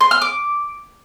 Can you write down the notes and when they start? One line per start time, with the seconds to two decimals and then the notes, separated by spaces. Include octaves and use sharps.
0.01 C6
0.11 F6
0.22 D6